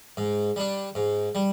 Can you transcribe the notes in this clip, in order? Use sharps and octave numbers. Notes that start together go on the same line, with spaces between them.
G#2
G3 D4
G#2
G3